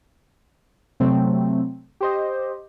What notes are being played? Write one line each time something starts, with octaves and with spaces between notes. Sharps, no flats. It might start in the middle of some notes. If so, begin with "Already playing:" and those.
C3 F#3 A3 C4
G4 C5 D#5